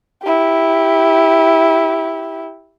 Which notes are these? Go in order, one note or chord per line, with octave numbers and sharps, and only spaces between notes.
E4 G4